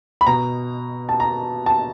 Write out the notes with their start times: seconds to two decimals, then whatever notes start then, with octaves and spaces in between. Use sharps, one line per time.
0.21 B5
0.27 B2 A#5
1.09 A5
1.20 A#5
1.66 A5